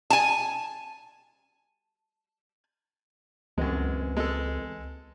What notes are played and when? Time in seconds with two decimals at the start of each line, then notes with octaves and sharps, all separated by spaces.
0.10 G#5 A5
3.58 C#2 F#2 E3 G#3 B3 C4
4.17 G#3 A4